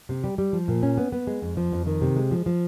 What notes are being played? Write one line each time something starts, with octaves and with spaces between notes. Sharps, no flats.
C3
G3
G3
F3
A#2
C#4
B3
B3
G#3
F2
F3
F2
D#3
C3
G#3
F3
F3